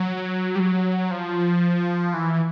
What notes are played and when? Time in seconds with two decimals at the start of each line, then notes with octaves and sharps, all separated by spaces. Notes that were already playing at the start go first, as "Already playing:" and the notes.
Already playing: F#3
0.55 G3
0.60 F#3
1.11 F3
2.14 E3